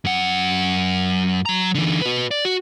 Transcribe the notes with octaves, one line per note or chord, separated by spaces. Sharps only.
F#2 F#5
F#3 A#5
D3 E3
F#4 B4
D5
F#4